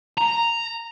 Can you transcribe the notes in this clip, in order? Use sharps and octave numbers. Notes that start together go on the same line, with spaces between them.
A#5